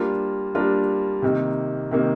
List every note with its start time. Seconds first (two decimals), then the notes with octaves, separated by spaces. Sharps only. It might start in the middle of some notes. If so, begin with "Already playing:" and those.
Already playing: G3 A#3 D4 F4 A#4
0.55 G3 A#3 D4 F4 A#4
1.22 C3 D#3 A#3
1.91 C3 D#3 A#3